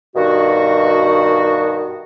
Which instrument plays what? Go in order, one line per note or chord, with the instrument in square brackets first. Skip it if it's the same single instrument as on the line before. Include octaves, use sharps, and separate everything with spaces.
[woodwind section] G2 B2 D#3 F#4